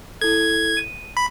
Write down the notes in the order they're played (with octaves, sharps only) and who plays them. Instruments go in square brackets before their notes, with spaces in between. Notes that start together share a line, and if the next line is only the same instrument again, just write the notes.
[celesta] E4 A4 [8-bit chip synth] G#6
[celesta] D#7
[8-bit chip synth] B5